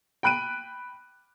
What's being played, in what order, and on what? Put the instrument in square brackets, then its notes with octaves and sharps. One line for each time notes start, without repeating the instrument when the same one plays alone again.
[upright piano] G5 B5 F#6 D7 D#7